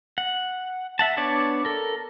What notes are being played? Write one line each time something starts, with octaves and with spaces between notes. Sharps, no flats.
F#5
E5 F#5 A5
B3 D4 C#5 D5 A5
A4 A#4